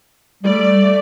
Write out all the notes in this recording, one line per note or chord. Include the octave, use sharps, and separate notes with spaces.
G3 A3 D5